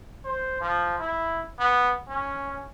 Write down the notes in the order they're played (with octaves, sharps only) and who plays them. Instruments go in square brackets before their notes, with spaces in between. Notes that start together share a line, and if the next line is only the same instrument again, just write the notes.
[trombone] C5
F3
E4
B3
C#4